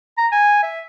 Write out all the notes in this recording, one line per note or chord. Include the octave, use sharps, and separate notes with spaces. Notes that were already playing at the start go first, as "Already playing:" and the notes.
A#5
G#5
E5